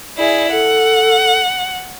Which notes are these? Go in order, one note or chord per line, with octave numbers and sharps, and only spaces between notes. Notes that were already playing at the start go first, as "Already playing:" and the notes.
E4 G#4 D5
A4 F#5